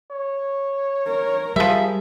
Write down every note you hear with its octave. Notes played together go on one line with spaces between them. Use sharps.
C#5
A#4
F3 G3 G#4 E5